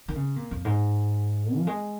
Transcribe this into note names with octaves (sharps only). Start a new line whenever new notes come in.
D#3
C#3
A#2
F2
G#2
F3
G#3